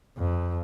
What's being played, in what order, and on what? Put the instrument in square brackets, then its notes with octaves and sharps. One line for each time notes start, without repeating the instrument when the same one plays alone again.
[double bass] F2